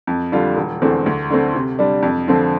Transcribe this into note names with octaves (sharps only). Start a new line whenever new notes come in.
F2
D3 G3 D4 F4
E1
E2 D3 A3 C4
D2
D3 A3 C4
C3
G3 D4
F2
D3 F3 C4